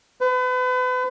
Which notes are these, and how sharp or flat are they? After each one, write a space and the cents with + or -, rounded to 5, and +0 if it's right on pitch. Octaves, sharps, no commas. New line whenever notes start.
B4 +35